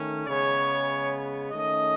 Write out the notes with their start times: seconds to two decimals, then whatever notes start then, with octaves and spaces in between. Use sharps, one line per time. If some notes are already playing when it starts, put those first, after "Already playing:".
Already playing: D#3 A3 C#4
0.26 C#3 G#3 B3 C#5
1.51 D#3 A3 C#4 D#5